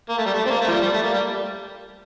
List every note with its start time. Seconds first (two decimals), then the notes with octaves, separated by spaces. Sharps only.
0.09 A#3
0.18 A3
0.26 G3
0.34 A3
0.46 C4
0.50 A#3
0.61 A3
0.67 F3
0.71 G3
0.81 G3
0.93 A3
1.03 A#3
1.13 G3